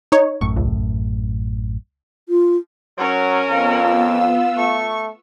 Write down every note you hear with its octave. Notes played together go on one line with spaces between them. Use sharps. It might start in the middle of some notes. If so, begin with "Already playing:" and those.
D#4 C#5
A1 F#2 A2 C#6
C#2
F4
F#3 C#4 A#4
F2 B3 F4 F5 E6
A3 C#6